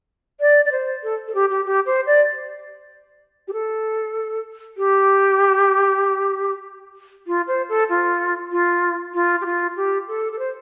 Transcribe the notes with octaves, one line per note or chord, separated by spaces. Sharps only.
D5
D5
C5
A4
A4
G4
G4
G4
C5
D5
G4
A4
G4
F4
C5
A4
F4
F4
F4
G4
F4
G4
A4
A4
C5